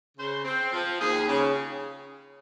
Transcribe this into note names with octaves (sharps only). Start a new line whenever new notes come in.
C#3 C5
C4
F3
D#2 G#4
C#3